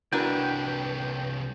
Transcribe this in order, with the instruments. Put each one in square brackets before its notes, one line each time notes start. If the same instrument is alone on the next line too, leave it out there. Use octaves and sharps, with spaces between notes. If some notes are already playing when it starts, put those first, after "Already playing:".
[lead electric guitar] C2 B4 [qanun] D4 G#5 [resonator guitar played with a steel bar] E4 F#4 A#4 [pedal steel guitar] G5